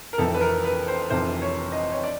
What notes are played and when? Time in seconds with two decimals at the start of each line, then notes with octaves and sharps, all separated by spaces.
0.13 A#4
0.18 F1 F2 C3 E3 A4
0.34 B4
0.41 A#4
0.65 B4
0.88 C5
1.10 F1 F2 C3 E3 C5
1.42 C#5
1.72 D#5
1.92 C#5
2.03 D5